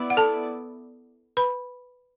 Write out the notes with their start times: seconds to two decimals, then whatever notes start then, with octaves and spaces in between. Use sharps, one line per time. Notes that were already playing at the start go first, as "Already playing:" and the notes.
Already playing: B3 E4 D5
0.10 F#5
0.17 A4 A5
1.37 B4 B5